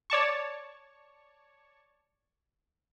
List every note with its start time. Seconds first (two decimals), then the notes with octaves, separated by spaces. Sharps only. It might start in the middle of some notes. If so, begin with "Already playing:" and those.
0.10 C#5 D5 A5 C#6